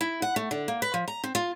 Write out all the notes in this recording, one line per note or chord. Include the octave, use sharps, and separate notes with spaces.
E4
F#5
A3
D3
A#3
B4
F3
A#5
C4
F4